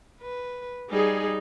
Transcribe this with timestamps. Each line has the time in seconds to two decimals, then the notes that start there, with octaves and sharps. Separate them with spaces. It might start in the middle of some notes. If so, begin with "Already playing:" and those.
0.21 B4
0.90 G3 D#4 G#4